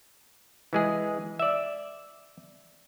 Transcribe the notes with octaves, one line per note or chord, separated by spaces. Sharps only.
E3 G#3 G#4
D5 E5